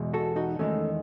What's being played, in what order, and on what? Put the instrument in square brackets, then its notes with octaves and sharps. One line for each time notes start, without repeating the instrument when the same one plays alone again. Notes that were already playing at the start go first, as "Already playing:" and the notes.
Already playing: [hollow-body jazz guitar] E2 B2 G#3
F#4 A4
D#4 F#4
E2 D#3 G#3 A3 C#4